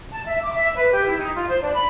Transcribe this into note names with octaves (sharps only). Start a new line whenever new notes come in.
A5
E5
D6
E5
B4
G4
E4
D#4
F4
C5
D4
B5